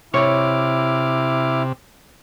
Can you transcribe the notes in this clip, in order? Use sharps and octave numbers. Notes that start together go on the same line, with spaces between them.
C3 E4 C#5 D6 F6